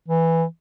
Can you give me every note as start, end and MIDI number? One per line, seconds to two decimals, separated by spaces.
0.08 0.44 52